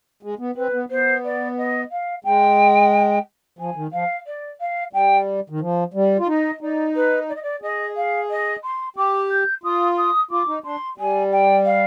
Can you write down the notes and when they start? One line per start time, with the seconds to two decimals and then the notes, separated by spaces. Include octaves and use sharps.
0.23 G#3
0.39 B3
0.56 C4 B4
0.73 B3
0.90 B3 C5
1.24 D5
1.57 D#5
1.91 F5
2.24 G#3 G5
3.59 F3 G#5
3.75 D#3
3.92 F3 F5
4.26 D5
4.60 F5
4.93 G3 G5
5.50 D#3
5.60 F3
5.94 G3
6.19 F4
6.27 D#4 D#5
6.61 D#4 D5
6.95 B4
7.29 D5
7.35 D#5
7.42 D5
7.62 G#4 D#5
7.96 F5
8.29 D#5
8.63 C6
8.96 G4 D6
9.30 G6
9.64 F4 D#6
9.97 D#6
10.30 F4 D6
10.47 D#4
10.64 D4 C6
10.98 G3 G#5
11.31 G5
11.65 F5